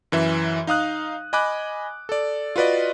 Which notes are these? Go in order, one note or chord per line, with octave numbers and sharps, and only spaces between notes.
F#2 E3 E5
D#4 F5 D#6 F#6
D#5 G#5 B5 D6 F#6
A4 D5
F4 F#4 B4 D5 D#5